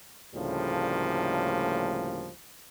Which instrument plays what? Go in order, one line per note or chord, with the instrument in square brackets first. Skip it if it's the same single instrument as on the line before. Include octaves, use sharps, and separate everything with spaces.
[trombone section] D2 A2 C#3 F3 G3 A#3